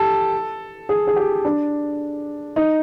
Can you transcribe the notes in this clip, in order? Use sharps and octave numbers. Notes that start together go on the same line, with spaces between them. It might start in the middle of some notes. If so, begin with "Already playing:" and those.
Already playing: G4 A4
G#4
G#4
G4
D4
D#4